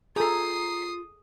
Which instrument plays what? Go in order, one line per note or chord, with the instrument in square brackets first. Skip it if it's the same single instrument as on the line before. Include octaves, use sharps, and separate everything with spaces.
[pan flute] F4 [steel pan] G#4 A4 [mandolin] A#5 E6 G6 [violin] D#6 C7